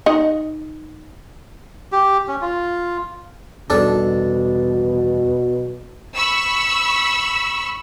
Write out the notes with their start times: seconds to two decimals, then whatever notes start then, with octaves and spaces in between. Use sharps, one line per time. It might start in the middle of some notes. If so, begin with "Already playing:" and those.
0.06 D#4 D#5
1.92 G4
2.28 C#4
2.42 F4
3.70 E2 B2 G3 D4 A4
6.16 B5 C#6 E6